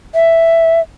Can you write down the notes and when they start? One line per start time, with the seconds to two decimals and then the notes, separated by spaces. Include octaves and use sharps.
0.15 E5